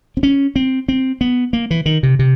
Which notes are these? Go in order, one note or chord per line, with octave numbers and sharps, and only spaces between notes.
C4
C#4
C4
C4
B3
A#3
E3
D#3
C3
C3